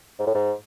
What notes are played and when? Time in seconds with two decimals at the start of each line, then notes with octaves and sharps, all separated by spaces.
0.19 G#2
0.27 A2
0.34 G#2